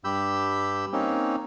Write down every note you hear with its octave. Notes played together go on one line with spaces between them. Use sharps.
G2 G4 B5 E6 G6
A#3 C4 C#4 D#4